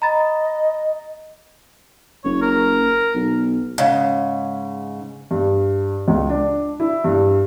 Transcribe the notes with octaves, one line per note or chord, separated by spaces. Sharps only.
D#5 A#5 B5 A6
F#1 C#5
A#4
B1
G#2 C#3
G2
C#2
D4
E4
G2